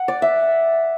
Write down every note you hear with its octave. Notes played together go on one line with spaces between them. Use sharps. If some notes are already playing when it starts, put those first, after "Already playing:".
Already playing: F#5
D5
E5